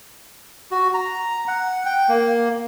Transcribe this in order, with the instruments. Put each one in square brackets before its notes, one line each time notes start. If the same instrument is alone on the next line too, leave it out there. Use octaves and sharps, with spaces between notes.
[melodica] F#4
A#5
F#5
G5
A#3